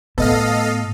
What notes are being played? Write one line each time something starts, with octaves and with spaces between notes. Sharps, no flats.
A2 B3 A4 D#5 F5